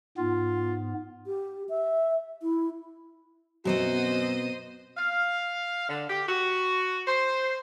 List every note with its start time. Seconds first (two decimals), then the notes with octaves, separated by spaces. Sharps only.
0.18 G#2 B3 F4
1.27 G4
1.69 E5
2.43 E4
3.65 F#2 B2 B3 C4 F#4 C5 D#5
4.97 F5
5.89 D3
6.10 G4
6.29 F#4
7.07 C5